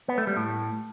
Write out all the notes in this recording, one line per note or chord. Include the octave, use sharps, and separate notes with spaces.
B3
A3
G3
A2